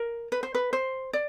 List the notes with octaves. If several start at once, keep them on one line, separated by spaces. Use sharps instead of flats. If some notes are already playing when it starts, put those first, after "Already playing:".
Already playing: A#4
B4
C5
B4
C5
D5